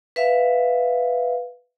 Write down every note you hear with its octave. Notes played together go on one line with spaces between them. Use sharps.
B4 E5 F5